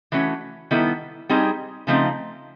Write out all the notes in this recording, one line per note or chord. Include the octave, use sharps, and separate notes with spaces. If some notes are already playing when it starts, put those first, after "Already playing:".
E3 A3 C#4 F#4
D#3 G3 B3 E4 A4
G3 C4 D#4 G#4
C#3 F3 A3 C4 D#4